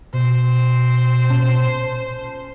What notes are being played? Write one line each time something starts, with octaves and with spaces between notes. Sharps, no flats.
B2 C5
A#2 C#4 A5